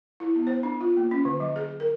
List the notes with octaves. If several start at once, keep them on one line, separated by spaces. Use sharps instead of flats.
E4
B3
C5
D4
F4
A#3
C#4
D3
F#3
G#4
A#4